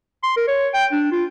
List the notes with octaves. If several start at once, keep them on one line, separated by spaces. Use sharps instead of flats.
C6
A#4
C#5
G5
D4
F4